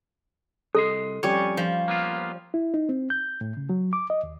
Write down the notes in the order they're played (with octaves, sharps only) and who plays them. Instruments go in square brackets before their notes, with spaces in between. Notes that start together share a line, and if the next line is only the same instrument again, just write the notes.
[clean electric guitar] C2 D#5 C6 [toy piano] A4
[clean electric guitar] F2 [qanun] G3 C#4 [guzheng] C#5
[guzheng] F3
[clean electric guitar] A#3 B3 F4
[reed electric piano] E4
D#4
C4
G6
A2
C#3
F#3
D6
D#5
D#2